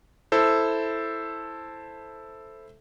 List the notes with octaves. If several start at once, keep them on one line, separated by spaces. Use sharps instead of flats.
E4 A4 C5